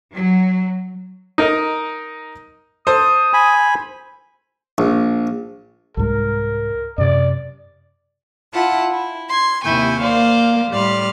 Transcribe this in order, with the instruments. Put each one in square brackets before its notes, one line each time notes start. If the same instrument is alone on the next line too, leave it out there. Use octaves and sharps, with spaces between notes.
[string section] F#3
[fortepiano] D#4 A#4 D#5
[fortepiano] A4 [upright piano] C5 [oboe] D#6
[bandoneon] G#5 B5
[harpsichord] A#1
[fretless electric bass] C2 G#2 G#3 [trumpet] A#4
[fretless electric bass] F#2 C3 [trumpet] D5
[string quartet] E4 F4 F#5 A5
E4
C6 G#6
D#2 C3 E4 G5 G#5 C#6
A#3 C5 D5 F5
A2 G3 D5 C6 F6